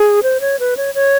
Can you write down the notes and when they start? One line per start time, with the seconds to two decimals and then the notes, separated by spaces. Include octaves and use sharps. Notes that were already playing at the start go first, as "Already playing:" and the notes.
Already playing: G#4
0.23 C5
0.41 C#5
0.59 B4
0.77 C#5
0.95 C#5